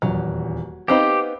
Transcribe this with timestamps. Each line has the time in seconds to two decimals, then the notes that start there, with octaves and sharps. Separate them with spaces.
0.02 D#1 E2 F#3
0.88 B3 C4 D#4 G4 F5 G5 B5